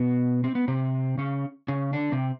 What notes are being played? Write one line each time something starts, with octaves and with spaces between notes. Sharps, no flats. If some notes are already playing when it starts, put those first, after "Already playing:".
Already playing: B2 B3
C4
B3
C3 C4
C#3 C#4
C#3 C#4
D3 D4
C3 C4